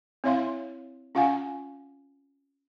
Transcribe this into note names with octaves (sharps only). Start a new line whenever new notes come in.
C4 E4 C#5 E5 F5 C6
C#4 F4 F5 F#5 G#5